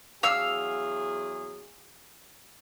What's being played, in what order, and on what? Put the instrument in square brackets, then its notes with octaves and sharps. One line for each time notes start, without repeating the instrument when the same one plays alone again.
[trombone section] E2 F#3 G#4 [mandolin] F5 E6